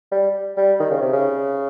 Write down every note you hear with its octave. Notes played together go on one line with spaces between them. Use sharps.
G3
G3
D#3
C#3
C3
C#3